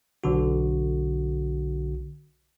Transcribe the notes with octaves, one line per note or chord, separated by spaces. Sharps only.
B1 D3 F#4